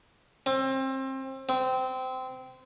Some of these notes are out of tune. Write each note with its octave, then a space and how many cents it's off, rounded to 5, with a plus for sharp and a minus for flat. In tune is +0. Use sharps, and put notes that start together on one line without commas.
C4 +30
C4 -20